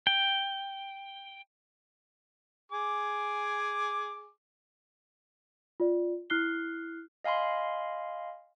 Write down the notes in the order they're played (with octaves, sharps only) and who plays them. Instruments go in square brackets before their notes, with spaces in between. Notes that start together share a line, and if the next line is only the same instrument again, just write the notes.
[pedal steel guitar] G5
[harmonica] G#4 G#5 D6
[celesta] F4 D5
E4 F6 F#6 C7 G7
[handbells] D#5 F5 G#5 B5 C6